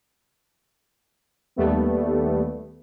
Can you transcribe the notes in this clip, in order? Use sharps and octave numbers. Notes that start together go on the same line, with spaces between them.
D#2 G3 A3 B3